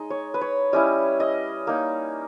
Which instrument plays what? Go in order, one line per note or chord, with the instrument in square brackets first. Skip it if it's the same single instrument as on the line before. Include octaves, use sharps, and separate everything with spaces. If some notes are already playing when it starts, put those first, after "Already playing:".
Already playing: [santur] G#3 D#4 D#5
C#5
B4
C#5
G3 C#4 E4 D#5
D#5
A#3 D#4